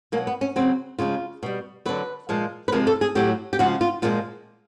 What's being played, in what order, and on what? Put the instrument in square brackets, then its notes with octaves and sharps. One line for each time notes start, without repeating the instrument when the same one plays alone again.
[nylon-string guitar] B2 F#3 A#3
B3
C#4
C#3 F#3 C4
C#3 F3 G#3 F4
B2 G3
D3 F#3 B4
A#2 F3 G#3
B4
C3 F3 G#3 A#4
A4
G#4
A2 F#3 G4
G4
C#3 F3 G#3 F#4
F4
A#2 F3 G#3 F4